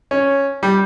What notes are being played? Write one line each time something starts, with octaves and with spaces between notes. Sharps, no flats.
C#4
G3